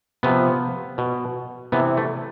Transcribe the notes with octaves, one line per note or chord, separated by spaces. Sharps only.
C3 F3 B3
B2
C3 E3 B3
A3